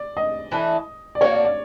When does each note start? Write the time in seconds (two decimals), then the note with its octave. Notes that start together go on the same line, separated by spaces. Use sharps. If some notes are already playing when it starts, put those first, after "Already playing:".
Already playing: D5
0.17 D#5
0.51 E3 A3 D4
1.15 D5
1.21 A#3 D4 F#4 C#5
1.33 D5
1.45 D5